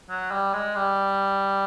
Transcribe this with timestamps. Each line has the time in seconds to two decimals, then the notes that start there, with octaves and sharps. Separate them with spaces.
0.10 F#3
0.31 G3
0.53 G#3
0.75 G3